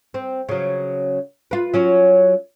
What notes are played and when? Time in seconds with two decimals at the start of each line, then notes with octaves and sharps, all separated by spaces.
0.14 C4
0.49 C#3 F#3
1.51 F4 B4
1.74 F#3 C#4 F#4